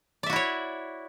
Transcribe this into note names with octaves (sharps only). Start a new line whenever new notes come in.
E4 F#4 C#5 D5 E5